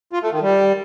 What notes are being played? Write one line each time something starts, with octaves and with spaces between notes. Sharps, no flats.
F4
A3
D#3
G3